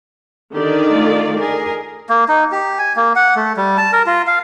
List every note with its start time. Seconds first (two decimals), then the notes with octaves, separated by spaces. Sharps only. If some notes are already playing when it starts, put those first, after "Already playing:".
0.53 D3 D#3 G4 D5
0.90 A3 F4
1.39 G#4 A#4
2.08 A#3
2.28 D#4
2.52 G4
2.79 G#5
2.96 A#3
3.16 F#5
3.36 A3
3.57 G3
3.78 A5
3.93 A#4
4.06 F4
4.27 F5